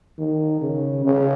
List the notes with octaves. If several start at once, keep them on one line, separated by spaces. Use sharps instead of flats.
D#3
C#3
C#3